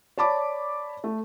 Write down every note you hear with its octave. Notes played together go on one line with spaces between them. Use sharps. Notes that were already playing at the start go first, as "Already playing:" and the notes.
C#5 D5 A5 B5 D6
A3